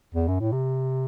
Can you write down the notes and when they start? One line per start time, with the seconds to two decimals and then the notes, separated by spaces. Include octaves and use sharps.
0.14 E2
0.28 F#2
0.40 A2
0.52 C3